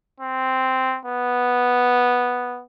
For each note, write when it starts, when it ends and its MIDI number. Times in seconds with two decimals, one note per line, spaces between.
0.21 0.98 60
1.06 2.63 59